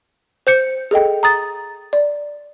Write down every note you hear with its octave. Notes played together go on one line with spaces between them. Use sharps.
C5 G6 C#7
G#4 A4 D#5 G5
A#5 D#6 A6
D5